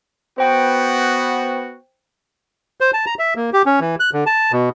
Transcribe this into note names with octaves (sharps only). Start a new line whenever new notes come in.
B3 F#4 C5 G5
C5
A5
A#5
E5
A#3
G4
C#4
E3
F#6
D3
A5
B2